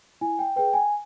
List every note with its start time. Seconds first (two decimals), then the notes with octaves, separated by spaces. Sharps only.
0.21 E4 G#5
0.39 G5
0.56 G#4 B4 G5
0.73 G#5